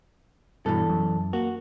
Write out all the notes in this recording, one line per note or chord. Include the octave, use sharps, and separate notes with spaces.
E2 G2 B2 E3 A4
F#2
A#3 F#4